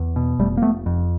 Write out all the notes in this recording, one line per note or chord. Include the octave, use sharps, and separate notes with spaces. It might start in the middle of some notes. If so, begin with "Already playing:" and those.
Already playing: E2
B2
F1 G3 A3
A#3
F1 A3 B3
F2